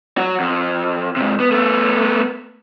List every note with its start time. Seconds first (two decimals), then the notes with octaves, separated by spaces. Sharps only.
0.18 F#3 F#4
0.40 F2
1.16 G#2 C3
1.40 B3
1.51 A3 B3